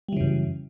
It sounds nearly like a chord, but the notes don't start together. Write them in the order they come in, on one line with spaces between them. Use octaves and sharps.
G3 E3 C#3 F#2